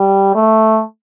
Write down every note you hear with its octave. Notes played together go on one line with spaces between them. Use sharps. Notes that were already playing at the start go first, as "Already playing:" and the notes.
Already playing: G3
A3